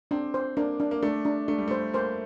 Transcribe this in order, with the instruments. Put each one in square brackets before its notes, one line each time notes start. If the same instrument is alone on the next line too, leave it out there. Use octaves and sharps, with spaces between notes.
[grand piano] C4 [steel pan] D4
[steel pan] C5
[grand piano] A#3 [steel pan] D4
[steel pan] D4
[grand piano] A#3
[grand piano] A3 [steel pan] D4
[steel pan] D4
[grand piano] A3 [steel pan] D4
[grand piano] G3
[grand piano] A3 [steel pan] C5
[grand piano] A#3 [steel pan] C5